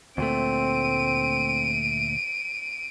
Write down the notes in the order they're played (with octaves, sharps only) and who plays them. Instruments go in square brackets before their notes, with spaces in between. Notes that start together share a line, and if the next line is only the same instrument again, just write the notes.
[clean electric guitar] D2 A#2 A3 [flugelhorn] C4 [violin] D7 D#7